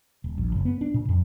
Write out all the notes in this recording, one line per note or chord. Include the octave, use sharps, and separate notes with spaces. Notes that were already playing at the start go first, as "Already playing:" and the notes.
D#1
A#1
F#1
B3
D4
A#2
F2